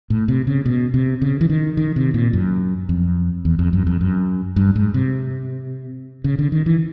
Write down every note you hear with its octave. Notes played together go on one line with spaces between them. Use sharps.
A2
C3
C#3
B2
C3
C#3
E3
D#3
D#3
C3
A#2
F#2
F2
E2
F2
F#2
F2
F#2
G2
G#2
C3
C#3
D3
D#3
E3